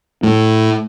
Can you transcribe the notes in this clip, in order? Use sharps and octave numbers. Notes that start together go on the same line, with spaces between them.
A2